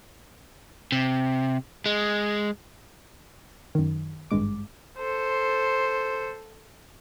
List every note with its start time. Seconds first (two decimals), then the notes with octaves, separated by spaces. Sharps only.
0.92 C3
1.86 G#3
3.75 F#2 D#3
4.31 G#1 G2 G#3 D6
4.98 A4 C5